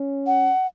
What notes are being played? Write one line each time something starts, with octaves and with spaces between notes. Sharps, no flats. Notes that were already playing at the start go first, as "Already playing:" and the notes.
Already playing: C#4
F#5